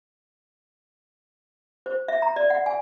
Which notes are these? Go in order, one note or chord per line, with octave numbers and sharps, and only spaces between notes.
C5
E5
A#5
D5
F#5
G#5